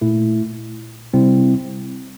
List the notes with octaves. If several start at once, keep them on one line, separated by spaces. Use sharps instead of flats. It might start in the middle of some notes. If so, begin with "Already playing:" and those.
A#2 A3 E4
C3 G3 C4 E4